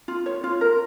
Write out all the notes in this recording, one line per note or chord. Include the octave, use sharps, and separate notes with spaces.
F4
C#5
F4
A#4